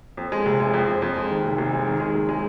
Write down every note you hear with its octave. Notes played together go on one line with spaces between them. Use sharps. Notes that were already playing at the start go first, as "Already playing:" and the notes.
F2
G#3
F1
G#3
F2
F2
F2
G#3
D#3
F1
F1
G#3
D#3
G#3
F1
G#3